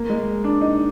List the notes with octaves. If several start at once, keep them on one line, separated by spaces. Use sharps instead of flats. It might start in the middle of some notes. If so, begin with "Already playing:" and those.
Already playing: A#3
G#3
D4
D#4